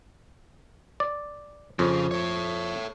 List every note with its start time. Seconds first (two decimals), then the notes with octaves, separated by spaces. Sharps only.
1.00 D5
1.79 F2 C#3
2.11 A4 C#5